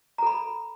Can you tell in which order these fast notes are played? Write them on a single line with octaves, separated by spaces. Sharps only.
A#5 A4 B5